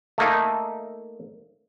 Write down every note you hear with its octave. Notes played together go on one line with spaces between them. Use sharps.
A3 A#3 D#4